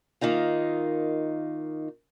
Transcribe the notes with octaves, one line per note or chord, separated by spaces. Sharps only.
D#3 A#3 D#4 F4